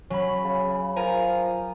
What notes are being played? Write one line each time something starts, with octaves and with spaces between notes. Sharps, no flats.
F#3 C#4 B5
C#3
F3 A#4 G#5 A#5